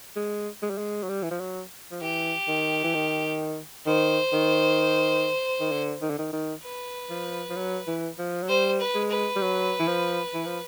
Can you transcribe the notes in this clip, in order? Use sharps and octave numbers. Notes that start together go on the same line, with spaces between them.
G#3
G#3
G3
G#3
F#3
G3
E3
F3
F#3
F3
E3 G4
D#3
E3
D#3
D#3 C5
D#3
D#3
D3
D#3
D3
D#3
D#3
B4
F3
F3
F#3
E3
F3
F#3
G3 C5
B4
G#3
B4
G3
F#3
E3
F3
E3
F3